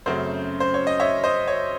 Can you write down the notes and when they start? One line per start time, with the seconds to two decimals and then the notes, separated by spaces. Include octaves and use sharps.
0.06 F#2 C#3 F#3 A3 C4 C5
0.60 C5
0.74 C#5
0.87 D#5
1.00 C#5 E5
1.24 C5 D#5
1.48 C#5